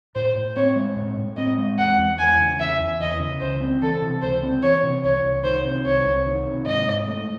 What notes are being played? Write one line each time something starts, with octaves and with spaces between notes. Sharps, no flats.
A2 C5
A2
C4 C#5
G#3
A2
A2
C4 D#5
G#3
E2 F#5
E2
E3 G#5
C#3
E2 E5
E2
E3 D#5
C#3
C#2 C5
C4
E3 A4
C3
C#2 C5
C4
E3 C#5
C3
C2 C#5
C2
D#3 C5
C3
C2 C#5
C2
D#3
C3
G#2 D#5
G#2
A3